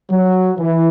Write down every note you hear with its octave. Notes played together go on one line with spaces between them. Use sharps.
F#3
E3